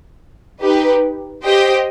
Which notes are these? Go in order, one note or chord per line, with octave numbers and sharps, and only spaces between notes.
D#4 G4 B4
G4 C5 D#5 G5